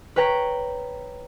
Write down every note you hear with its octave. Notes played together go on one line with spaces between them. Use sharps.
B4 C#5 G5 A#5 B6